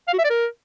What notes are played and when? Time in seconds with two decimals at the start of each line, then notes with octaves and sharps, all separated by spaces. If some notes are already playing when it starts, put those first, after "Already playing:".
0.08 F5
0.13 F#4
0.19 E5
0.25 D5
0.30 A#4